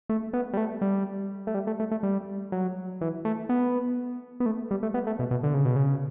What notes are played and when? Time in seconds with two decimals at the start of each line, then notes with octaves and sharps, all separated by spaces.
0.09 A3
0.33 B3
0.53 G3
0.57 A3
0.81 G3
1.47 A3
1.54 G3
1.67 A3
1.80 A3
1.91 A3
2.03 G3
2.52 F#3
3.01 E3
3.25 A3
3.49 B3
4.40 B3
4.46 A3
4.71 G3
4.83 A3
4.94 B3
5.07 A3
5.19 B2
5.31 B2
5.43 D3
5.54 C#3
5.65 B2
5.76 C#3